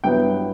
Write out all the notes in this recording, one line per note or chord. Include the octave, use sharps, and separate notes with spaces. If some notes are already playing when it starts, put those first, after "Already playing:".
G2 F#3 B3 E4 G5